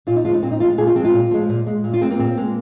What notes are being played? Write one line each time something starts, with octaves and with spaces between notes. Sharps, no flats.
A#2 F4
D#4
F3 G#3 F4
D#4
A#2 C4
D#4
F3 G#3 F4
A#2 G#4
F4
F3 G#3 C4 F4
A#2
F3 G#3
A#2
G#3
A#2
F4
G#3 C4
A#3
A#2 C4
G#3 A#3